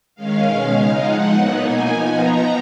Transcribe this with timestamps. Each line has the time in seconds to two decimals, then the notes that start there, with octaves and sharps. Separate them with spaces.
0.15 D#3 G#3 C#4 F5
0.44 B2 G#3 C#4
0.73 C#3 G#3 D#4
1.01 F3 G#3 D#4 F#5
1.29 A#2 F#3 B3 D#4
1.58 B2 A#3 D#4 G#5
1.86 F3 B3 D#4 G#5
2.15 F3 B3 D#4 A#5